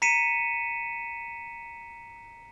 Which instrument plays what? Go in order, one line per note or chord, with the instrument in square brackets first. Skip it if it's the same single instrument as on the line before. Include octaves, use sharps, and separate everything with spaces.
[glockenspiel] A#5 B6 C#7 D#7 E7